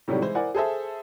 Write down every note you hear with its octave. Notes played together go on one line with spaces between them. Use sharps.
A2 C3 D#3 F#3 G3
E3 G#3 E4 C5
E4 A#4 C5 D5 F#5 G#5
G#4 A4 C5 E5